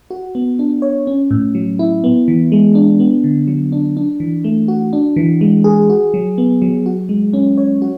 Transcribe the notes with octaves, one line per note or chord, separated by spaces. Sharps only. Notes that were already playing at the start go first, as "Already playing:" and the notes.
F#4
B3
D4
C#5
C#4
A2
F#3
E4
B3
E3
G#3
D4
B3
D3
F#3
D4
D4
E3
A3
F#4
D4
E3
G#3
G#4
F#4
F#3
B3
F#3
F#4
G#3
C#4
C#5
F#4